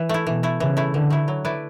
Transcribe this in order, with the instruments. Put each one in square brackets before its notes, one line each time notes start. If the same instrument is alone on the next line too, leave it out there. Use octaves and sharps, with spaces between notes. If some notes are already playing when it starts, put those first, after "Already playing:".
Already playing: [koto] E3 B4
A3 E4
[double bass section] B2 [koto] E3
[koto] A3 E4
[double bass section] C#3 [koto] E3
[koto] A3 E4
[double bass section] D3 [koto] E3
[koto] A3 E4
F#3
A3 E4 B4 D5